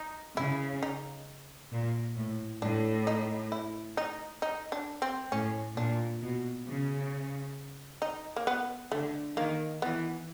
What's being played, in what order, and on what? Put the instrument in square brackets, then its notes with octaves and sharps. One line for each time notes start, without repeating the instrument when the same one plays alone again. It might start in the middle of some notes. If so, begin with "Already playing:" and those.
Already playing: [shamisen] D#4
[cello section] C#3 [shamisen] E4
[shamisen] D#4
[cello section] A#2
A2
[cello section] A2 [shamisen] D4
[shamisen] D#4
E4
D#4
D#4
D4
C4
[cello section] A2 [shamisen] C#4
[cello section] A#2 [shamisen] D4
[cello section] B2
C#3
[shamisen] D#4
A#3
B3
[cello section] D3 [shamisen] A3
[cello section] D#3 [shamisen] A#3
[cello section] E3 [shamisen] B3